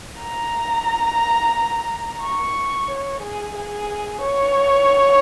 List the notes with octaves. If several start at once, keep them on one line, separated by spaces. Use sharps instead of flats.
A#5
C#6
C#5
G#4
G#4
C#5